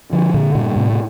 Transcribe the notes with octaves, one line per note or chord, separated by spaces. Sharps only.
D3 F3
A#2 D3
G2 A#2
A2 C3
C3